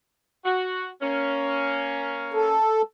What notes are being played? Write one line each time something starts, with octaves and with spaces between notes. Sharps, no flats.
F#4
A#3 C#4
A4